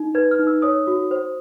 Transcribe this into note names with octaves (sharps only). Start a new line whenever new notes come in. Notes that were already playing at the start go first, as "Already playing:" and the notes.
Already playing: D#4
B4 G#6
F6
D#4
E6
C#5 D#6
F#4
C5